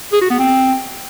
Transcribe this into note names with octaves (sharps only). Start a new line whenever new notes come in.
G#4
F#4
B3
C4